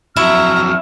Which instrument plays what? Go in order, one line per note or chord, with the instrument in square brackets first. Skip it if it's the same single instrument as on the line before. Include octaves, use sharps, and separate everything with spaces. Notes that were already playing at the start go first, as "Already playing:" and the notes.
[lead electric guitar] F2 F#3 [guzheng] E4 [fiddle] E5 A#5 [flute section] C#6 F6